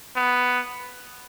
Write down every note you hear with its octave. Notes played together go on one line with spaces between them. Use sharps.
B3